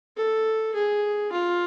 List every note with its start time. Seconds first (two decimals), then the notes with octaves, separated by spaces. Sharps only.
0.17 A4
0.75 G#4
1.32 F4